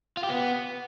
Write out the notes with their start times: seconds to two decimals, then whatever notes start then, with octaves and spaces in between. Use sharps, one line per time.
0.17 F4
0.23 G4
0.30 B3